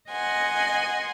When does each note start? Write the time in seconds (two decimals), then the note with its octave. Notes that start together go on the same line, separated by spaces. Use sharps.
0.11 D#5 F#5 G#5 C6